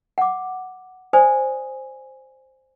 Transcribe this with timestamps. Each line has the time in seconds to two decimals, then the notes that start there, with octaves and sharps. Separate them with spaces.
0.18 F#5 D6
1.13 C5 D5 G#5 D#6